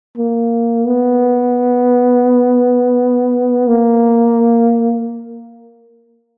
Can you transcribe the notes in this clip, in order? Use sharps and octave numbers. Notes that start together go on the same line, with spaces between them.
A#3
B3
A#3